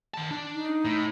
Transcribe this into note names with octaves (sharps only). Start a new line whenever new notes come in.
D#3 A5
D4
D#4
A2